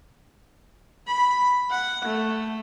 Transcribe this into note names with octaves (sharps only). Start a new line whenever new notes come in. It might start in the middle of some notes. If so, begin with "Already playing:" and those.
B5
F#5
A3